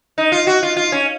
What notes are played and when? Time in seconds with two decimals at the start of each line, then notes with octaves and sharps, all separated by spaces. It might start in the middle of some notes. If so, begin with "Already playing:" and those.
0.18 D#4
0.32 F4
0.47 F#4
0.63 F4
0.77 F4
0.92 C#4